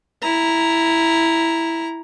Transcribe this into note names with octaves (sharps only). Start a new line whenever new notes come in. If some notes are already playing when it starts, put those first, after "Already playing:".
E4 A#5